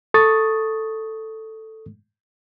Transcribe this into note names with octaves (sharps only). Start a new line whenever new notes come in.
A4 C#6 D#6 A6